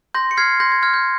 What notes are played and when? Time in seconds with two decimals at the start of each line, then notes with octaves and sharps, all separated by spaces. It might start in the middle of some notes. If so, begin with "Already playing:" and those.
0.14 C6 G6 A#6
0.31 C#7
0.37 F6 G#6 C7
0.60 C6 G6 A#6
0.72 G#6
0.83 F6 G#6
0.94 G6